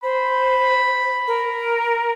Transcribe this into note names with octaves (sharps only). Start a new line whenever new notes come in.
C5 B5
A#4